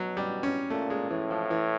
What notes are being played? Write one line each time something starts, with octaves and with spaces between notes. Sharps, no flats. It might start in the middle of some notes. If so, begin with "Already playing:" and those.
Already playing: B2 F#3
G3
C#4
A#2 A3
G#3
A2 E3
F3
E3